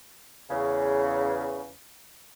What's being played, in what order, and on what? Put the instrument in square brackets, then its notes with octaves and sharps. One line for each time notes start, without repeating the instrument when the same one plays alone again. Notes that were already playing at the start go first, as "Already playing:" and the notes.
[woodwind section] E2 C#3